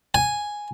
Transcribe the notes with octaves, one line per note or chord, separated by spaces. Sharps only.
G#5